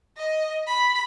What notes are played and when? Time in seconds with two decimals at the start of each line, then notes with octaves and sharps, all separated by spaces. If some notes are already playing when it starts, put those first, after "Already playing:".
0.18 D#5
0.67 B5